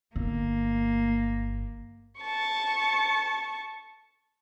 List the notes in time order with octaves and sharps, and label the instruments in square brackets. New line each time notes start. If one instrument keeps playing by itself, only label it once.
[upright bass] G1 [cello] A#3
[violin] A5 C#6